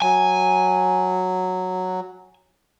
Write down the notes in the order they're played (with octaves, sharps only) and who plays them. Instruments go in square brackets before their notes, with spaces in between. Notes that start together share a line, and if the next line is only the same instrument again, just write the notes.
[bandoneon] F#3 [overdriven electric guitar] G#5